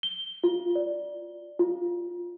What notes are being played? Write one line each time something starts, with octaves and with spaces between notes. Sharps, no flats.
G7
F4
D5
F4